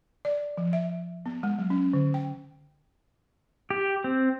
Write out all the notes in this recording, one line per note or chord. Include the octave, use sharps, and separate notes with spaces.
D5
F3
E5
B3
G#3
F#3
C#4
D3
G5
G4
C4